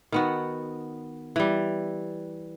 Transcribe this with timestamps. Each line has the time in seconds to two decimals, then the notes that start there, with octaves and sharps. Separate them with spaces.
0.12 D#3 B3 F#4
1.36 E3 G3